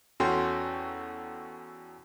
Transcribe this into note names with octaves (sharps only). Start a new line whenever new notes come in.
E2 C#4 F#4 A4 G5 C6